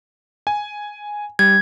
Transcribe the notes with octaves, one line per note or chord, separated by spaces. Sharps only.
G#5
G3 G#6